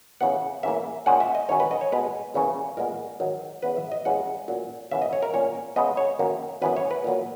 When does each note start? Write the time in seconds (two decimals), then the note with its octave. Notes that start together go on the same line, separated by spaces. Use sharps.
0.21 C#3 E3 B3 F#5
0.63 C#3 E3 A#3 E5
1.06 A#2 G#3 C#4 F#5
1.20 E5
1.35 D#5
1.49 G#2 D#3 F#3 C#4 C#5
1.60 B4
1.71 D#5
1.81 C#5
1.92 B2 G#3 B3 B4
2.34 E2 C#3 E3 A#3 C#4
2.77 A#2 G#3 B3 A#4
3.20 G#2 D#3 F#3
3.62 E2 C#3 E3 B3 B4
3.77 E5
3.92 D#5
4.05 E2 C#3 G#3 F#5
4.48 A#2 F#3 C#4
4.91 C#3 E3 B3 E5
5.02 D#5
5.13 C#5
5.22 A#4
5.33 A#2 A#3 C#4 C#5
5.76 C#3 G#3 B3 D#5
5.97 C#5
6.19 F#2 D#3 A#3
6.62 F#2 E3 B3 B4
6.77 C#5
6.91 B4
7.04 A#2 F#3 A#3